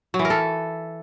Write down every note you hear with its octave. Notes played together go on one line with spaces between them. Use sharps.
F#3
E3
A#4
A4